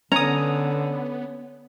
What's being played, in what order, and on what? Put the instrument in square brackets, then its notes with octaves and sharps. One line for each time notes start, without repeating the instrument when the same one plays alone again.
[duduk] D3 [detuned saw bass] B3 [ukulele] C#4 [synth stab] A#5 D#6